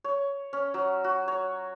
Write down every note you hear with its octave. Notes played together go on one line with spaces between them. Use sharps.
C#5
C#4
F#3
F#4
C#5